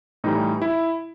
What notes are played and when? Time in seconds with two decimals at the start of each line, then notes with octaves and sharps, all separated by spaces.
0.24 A2 E3 G3 D#4
0.62 E4